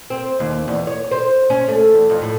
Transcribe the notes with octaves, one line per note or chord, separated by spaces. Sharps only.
C4
D#2
E2
C#5
C5
C#4
A3
E2
F2
A2